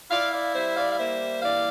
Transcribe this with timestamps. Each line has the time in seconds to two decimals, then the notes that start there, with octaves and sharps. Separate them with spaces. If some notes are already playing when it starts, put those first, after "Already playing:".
0.11 E4 D5 F5
0.33 D5 F5
0.55 G3 C5 E5
0.77 D5 F5
0.92 F5
0.98 A#3 C5 E5
1.42 E3 D5 F5